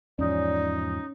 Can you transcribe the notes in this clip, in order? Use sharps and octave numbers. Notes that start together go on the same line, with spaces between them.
E2 G#2 F3 C#4 D#4 D5